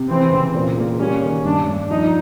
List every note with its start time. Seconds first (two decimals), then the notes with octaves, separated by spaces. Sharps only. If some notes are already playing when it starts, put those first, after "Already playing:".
Already playing: C3
0.10 E3 C4
0.33 C#3
0.55 A#2
0.78 A#3
1.00 G3 C#4
1.23 D#3
1.45 G2 D4
1.68 G2
1.91 F3 D#4